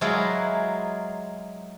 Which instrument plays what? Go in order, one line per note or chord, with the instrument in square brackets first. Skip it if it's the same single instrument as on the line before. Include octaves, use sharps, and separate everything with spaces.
[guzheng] F#3 G#3 E4 F4 G#4 A#4